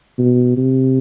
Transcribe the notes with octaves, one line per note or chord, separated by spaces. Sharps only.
B2
C3